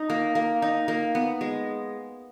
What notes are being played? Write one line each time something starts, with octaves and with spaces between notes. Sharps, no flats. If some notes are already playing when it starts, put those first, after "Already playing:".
Already playing: D#4
A#3
A#3
D#4
A#3
B3
G#3